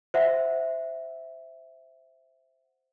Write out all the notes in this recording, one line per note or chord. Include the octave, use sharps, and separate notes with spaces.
C5 E5 F#5